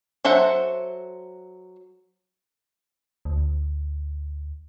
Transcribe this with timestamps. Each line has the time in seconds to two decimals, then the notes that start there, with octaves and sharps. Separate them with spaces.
0.25 F#3 A4 C5 E5 F#5
3.25 D2